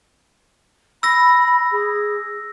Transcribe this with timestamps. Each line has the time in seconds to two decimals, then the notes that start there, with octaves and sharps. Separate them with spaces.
1.03 B5 E6 A#6
1.71 G#4